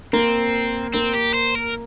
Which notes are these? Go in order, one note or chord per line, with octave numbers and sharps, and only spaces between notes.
A#3 C4
A#3 C4
G4
C5
A#4